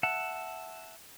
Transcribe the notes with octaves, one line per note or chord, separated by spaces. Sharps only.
E5 F#5 A5